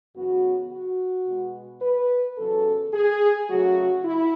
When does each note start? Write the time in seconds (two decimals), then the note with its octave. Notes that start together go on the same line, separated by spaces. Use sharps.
0.15 F#2 C#3 E3 B3 F#4
0.71 F#4
1.26 B2 G#3 B3
1.81 B4
2.37 E2 C#3 F#3 A4
2.93 G#4
3.49 C#3 F#3 A3 F#4
4.04 E4